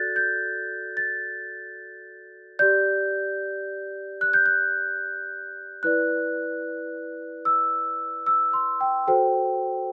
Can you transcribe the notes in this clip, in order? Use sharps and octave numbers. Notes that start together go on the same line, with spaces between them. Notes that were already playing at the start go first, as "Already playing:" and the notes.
Already playing: F#4 A4 D5 F#6 G6 A6
G6
A6
G4 D5 G6
F#6
G6
F#6
E4 B4 D5 F#6
E6
E6
C6
G5
F#4 A4 C5 G5